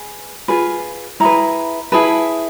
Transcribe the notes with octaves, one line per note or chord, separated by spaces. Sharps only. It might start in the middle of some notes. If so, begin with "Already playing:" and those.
Already playing: G#4 B4
F4 G#4 B4
E4 G#4 B4 A#5
E4 G#4 B4 A5